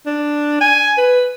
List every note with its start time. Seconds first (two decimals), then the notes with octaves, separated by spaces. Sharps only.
0.06 D4
0.61 G#5
0.98 B4